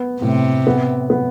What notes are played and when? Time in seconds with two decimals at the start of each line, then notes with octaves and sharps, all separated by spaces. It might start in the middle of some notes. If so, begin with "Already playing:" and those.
Already playing: B3
0.21 A2 C3
0.67 B3
1.10 B3